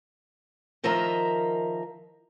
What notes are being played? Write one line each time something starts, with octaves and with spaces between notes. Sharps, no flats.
D#3 F3 A#4 D#5 E5 A#5